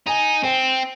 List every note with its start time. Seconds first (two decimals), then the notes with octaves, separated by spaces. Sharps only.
0.07 D#4 G#5
0.44 C4 G5